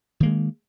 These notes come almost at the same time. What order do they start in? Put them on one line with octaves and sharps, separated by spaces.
D#3 A#3 G#3